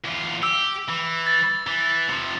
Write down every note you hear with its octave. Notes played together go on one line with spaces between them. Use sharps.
E2 F4
G4 E6
E3
A6
E3
C3 F3